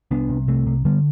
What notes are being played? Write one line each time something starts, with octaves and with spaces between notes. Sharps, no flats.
C2 B3 D4
C3
C2 A3 C4
C3
D3 G3 B3